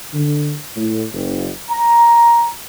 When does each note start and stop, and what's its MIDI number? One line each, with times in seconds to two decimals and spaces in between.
0.14 0.53 50
0.77 1.03 45
1.13 1.50 30
1.70 2.46 82